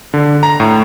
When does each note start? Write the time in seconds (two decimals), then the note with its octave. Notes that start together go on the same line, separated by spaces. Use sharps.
0.14 D3
0.43 A#5
0.60 A2